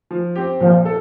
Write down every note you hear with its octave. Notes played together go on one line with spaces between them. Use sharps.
F3
C4 G4
A#2 F3
A4